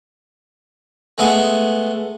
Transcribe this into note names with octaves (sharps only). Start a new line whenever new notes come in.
G#3 A3 B3 G#4